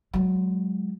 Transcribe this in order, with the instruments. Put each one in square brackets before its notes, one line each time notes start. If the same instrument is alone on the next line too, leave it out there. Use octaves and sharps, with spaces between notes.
[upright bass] F#3 G#3